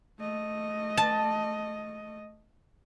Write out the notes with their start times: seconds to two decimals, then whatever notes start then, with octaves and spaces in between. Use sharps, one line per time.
0.19 A3 D#5
0.97 A5